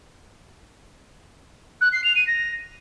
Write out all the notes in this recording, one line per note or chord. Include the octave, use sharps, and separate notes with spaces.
F#6
C7
F7
D#7
A#6